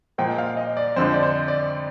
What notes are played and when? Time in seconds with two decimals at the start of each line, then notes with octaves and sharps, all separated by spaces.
0.18 A#2 F3 G#3 G5
0.38 F5
0.57 D#5
0.77 D5
0.96 F2 D3 F3 G#3 C5
1.13 D5
1.23 C5
1.48 D5